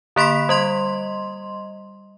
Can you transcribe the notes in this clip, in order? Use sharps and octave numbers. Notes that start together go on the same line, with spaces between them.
D3 A#3 B5 C6 B6
G3 D#5 C6